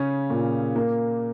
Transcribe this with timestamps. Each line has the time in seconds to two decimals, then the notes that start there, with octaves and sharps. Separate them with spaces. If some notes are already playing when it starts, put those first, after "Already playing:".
Already playing: C#3 C#4
0.30 A#2
0.76 A#3